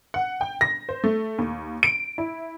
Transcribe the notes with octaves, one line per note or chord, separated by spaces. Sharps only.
F#5
G5
A#6
C5
A3
D#2
D7
E4